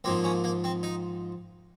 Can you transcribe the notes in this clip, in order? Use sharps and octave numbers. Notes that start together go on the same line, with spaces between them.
G#2 F3 A#3 C4
C#4
A#3
C4
D#4